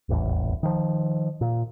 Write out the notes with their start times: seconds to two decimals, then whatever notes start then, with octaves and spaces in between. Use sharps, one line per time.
0.09 D#1 A1 E2
0.63 D#3 F3
1.41 A#2